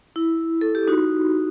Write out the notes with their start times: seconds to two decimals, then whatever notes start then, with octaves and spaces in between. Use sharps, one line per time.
0.16 E4
0.61 A4
0.75 G4
0.88 D#4 F#4